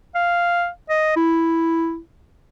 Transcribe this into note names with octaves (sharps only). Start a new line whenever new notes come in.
F5
D#5
E4